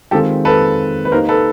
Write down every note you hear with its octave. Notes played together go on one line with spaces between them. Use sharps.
D#3 G#3 C4 F4 G4 A4
A4 B4
B4
A#3 D#4 G4 A#4 C5
A4 B4